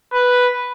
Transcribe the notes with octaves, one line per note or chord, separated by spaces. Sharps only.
B4